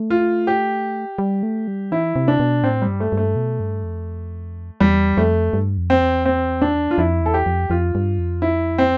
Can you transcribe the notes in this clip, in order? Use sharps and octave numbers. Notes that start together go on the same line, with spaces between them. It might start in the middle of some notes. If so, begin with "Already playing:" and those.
Already playing: A3
F4
G4
G3
A3
G3
E3 E4
C3
D4
B2
A2 C4
G3
G2
A3
G2
A3
B2
G2
F2
E2 G3
F2 A3
G2
F2
C4
E2
C4
D4
F4
F2 E4
E2 A4
G4
F2
F2 F4
G2
F2
E4
C4